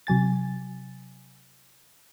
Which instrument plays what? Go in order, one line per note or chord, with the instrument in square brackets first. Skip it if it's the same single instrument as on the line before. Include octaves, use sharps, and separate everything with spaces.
[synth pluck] C3 F#3 G#5 A6